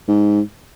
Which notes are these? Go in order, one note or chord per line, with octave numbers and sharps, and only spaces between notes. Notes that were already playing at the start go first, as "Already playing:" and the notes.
G#2